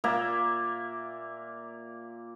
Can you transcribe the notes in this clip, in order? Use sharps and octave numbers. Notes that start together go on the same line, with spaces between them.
A#2 A#3 A#4 E5